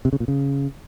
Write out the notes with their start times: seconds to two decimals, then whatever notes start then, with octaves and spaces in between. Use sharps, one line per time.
0.05 C3
0.13 C#3
0.20 A#2
0.28 C#3